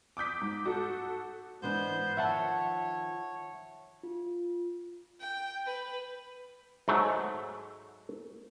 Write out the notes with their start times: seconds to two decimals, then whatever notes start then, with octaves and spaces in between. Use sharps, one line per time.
0.17 D6 D#6 G6 B6
0.41 G#2
0.65 F#4 A4
1.62 G#2 E3 B3 D4 C5 G6
2.17 D#3 F3 C#5 E5 F#5 A5
4.03 F4
5.20 G5
5.66 B4
6.88 G#2 F#3 A3